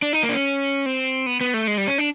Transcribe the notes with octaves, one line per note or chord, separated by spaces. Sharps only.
D4
D#4
A#3
D4
C#4
C4
B3
B3
A3
G#3
G3
C#4
D4